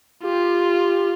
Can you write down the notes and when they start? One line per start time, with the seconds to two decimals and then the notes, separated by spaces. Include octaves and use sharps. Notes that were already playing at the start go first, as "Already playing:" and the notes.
0.24 F4 G4